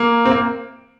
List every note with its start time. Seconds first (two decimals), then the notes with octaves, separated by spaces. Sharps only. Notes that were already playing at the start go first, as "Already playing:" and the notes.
Already playing: A#3
0.25 C4
0.31 A#3